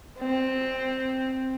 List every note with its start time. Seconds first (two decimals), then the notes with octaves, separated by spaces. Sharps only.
0.19 C4